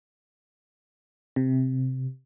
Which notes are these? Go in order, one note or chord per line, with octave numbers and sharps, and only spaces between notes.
C3